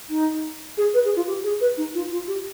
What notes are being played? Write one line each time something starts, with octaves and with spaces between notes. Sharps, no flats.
D#4
G#4
B4
G#4
F4
G4
G#4
B4
D#4
F4
F4
G4